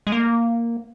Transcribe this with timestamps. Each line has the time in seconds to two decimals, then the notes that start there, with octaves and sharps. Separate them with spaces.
0.07 G#3
0.12 A#3